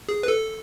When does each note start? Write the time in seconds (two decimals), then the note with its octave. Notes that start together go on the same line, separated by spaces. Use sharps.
0.09 G#4
0.23 B4
0.28 A4